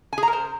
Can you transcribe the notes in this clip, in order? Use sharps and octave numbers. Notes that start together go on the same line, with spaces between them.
G#5
G#4
A#5
A#4
C5